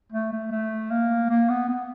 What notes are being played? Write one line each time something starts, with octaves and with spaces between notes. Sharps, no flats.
A3
A3
A3
A#3
A#3
B3
B3